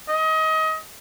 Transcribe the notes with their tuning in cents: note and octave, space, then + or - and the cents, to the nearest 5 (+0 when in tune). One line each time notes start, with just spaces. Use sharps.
D#5 +25